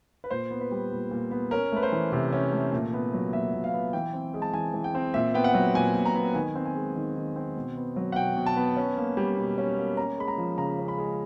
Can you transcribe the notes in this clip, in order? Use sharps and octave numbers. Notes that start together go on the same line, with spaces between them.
B4
A#2 C5
B3
B4
G3
A#2
A#2
B3
C#4 A#4
A3 B4
C5
E3
C3
C#4
A3
A#2
B3
F#3
A#2 E5
A#2
F5
B3
E3 G5
C4
G#3
A5
E3 G#5
E3
G5
C4
A#2 E5
B3 G5
F#5
F#3
A#2 G#5
A#2
A#5
B3
D#3 G#5
C4
G#5
G#3
D#3
D#3
C4
B2
B3
F#3
F#5
B2 G5
B2
A5
B3
C#4
A#3
G3
B2
C#4
A#3
C#4 A#5
G#3 B5
A#5
F3
C#3 A#5
C#4
B5
G#3